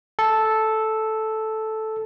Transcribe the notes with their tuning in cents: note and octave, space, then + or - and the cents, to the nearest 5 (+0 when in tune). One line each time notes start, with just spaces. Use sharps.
A4 -5